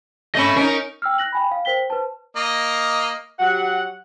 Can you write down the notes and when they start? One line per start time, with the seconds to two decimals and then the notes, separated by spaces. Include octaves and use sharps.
0.35 A3 C#4 D#5 B5
0.56 C#4 D#4 A#4
1.02 G5 E6 F6
1.18 F#6 A#6 F#7
1.33 G5 G#5 B5
1.51 F5
1.65 A#4 C5 G5 B6 G7
1.90 B4 C5 A5
2.36 A#3 D#5
3.39 F#3 G4 F#5